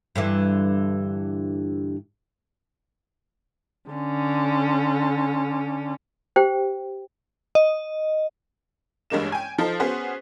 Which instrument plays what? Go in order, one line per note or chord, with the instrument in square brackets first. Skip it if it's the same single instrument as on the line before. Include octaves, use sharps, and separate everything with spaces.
[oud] G2 D3 E3
[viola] D3 C#4
[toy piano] G4 C5 G5
[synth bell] D#5
[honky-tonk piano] A1 G2 G#3 A#3 E7
G5 G#5
F3 D#4 A4 C5 C7
B3 C#4 F#4 G#4 C5